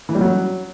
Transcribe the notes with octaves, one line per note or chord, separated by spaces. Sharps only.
E3
G3
F#3